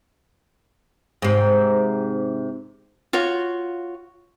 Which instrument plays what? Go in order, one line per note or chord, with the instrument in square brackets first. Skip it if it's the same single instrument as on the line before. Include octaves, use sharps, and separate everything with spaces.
[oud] G#2 C3
[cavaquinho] F4 F#4 C#5